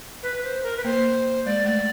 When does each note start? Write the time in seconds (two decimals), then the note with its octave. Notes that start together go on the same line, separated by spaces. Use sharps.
0.23 B4
0.44 C5
0.63 A#4
0.77 B4
0.84 A#3 C5
1.45 G#3 D5
1.66 A3